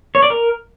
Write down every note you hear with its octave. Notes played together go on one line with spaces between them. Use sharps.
C#5
D5
A#4